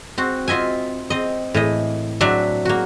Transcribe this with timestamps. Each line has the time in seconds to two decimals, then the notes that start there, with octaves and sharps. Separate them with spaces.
0.18 C4 F#4
0.48 C4 F4 D#5 E5 G#5
1.10 C4 D#5
1.54 A2 E3 D#5
2.21 F#3 C4 D4 F#4 D5 E5
2.65 A#3 F#4